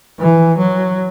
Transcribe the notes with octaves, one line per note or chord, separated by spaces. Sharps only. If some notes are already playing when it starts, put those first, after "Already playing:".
E3
F#3